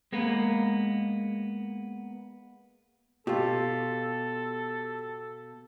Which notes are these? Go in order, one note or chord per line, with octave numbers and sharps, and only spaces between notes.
G#3 A#3 B3
B2 F4 G4 A4